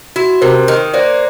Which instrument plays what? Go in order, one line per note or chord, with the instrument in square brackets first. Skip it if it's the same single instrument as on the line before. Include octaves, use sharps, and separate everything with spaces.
[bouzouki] E4 [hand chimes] F#4
[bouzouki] C3 [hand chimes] A#4 C5
[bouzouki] D#3
[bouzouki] A#3 [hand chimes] C5 D5